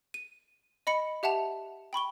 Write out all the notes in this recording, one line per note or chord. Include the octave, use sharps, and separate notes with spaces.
D#7
D#5 B5 C#7
G4 E5 F#5 A5 F7
G5 B5 C#6 G7